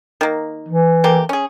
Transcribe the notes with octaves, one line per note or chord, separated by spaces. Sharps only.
D#3 A#3
E3
A3 A#3 G4
C#4 G#4